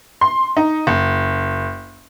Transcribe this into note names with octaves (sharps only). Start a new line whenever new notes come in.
C6
D#4
F#1